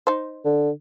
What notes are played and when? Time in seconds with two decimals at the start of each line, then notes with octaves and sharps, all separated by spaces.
0.07 D#4 C5
0.45 D3